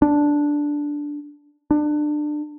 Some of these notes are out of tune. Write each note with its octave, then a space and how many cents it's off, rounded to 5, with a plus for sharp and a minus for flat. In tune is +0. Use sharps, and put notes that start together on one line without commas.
D4 -5
D4 +25